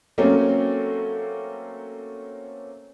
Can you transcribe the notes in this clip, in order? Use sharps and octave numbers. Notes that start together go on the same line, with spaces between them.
F#3 A3 A#3 C4 C#4